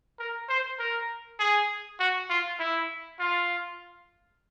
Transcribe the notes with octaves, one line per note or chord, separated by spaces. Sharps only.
A#4
C5
A#4
G#4
F#4
F4
E4
F4